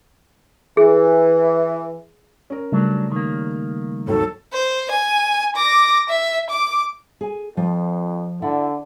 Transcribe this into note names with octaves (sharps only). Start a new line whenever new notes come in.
E3 G#4
C#4 A#4
C#3 F#3 G3 A3 D4
D#3 A#3
G#1 D#2 F#3 A4
C5
G#5
D6 A#6
E5
D6
G#4 G#5
F2 F3
D3 E4 D5 F#5